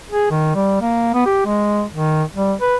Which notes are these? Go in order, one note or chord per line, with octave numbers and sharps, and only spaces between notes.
G#4
D#3
G3
A#3
B3
G4
G#3
D#3
G3
B4